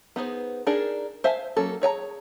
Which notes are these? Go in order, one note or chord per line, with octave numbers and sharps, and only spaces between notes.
B3 D#4 G#4 C5
D4 D#4 G#4 A#4 D5
C5 E5 F5 G#5
F#3 A#3 C#4 A4
G#4 C#5 G#5 A#5